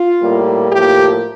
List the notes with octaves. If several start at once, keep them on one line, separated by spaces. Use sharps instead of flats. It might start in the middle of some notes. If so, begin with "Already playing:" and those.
Already playing: F4
A2 G3 A#3
A2 F3 A#3 G4